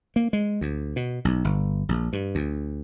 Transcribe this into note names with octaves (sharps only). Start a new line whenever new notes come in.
A#3
G#3
D2
B2
B1
G1
A#1
G2
D2